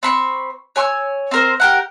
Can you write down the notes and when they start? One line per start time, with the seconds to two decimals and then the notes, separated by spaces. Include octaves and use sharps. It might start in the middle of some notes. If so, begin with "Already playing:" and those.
0.03 C4 B5 C#6
0.76 C#5 G#5 C#6 E6
1.31 C4 A#4 C5
1.60 G4 A#4 F#5